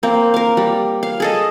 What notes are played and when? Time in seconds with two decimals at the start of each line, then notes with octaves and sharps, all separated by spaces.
0.03 A#3 C4
0.34 A#4 F5
0.57 G3
1.03 F5
1.20 G#4 A4 D#5